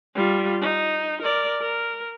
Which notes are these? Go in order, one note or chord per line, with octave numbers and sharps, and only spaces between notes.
G3 F4
D#4
A#4 D5
A#4